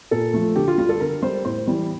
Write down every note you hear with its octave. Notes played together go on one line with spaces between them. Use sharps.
A#2 A4
F3 A3
D3 G4
F4
G3 F4
A4
D3 A#4
G3 C5
A2 C5
E3 G3